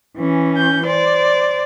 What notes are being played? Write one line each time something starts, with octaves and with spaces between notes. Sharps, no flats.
E3 C#4
G6
C5 D5